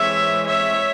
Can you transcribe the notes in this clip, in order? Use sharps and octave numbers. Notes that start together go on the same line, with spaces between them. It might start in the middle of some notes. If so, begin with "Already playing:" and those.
Already playing: E3 G#3 C4 C#5 E5
C#5 E5